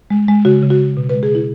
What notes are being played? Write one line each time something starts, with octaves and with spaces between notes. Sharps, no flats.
G#3
G#3
C#3 F#4
C#3
F#4
G#3
B2
G#3 B4
G#4
B2 E4